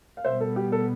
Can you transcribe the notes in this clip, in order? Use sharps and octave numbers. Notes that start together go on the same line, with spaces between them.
F5
B2 G3 B3 C5 E5
A4
G4
A4